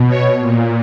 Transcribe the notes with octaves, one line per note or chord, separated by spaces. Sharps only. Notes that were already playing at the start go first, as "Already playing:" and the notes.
Already playing: B2
C#5
A#2